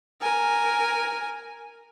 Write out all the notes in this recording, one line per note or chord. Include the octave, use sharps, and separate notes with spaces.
A#4 G#5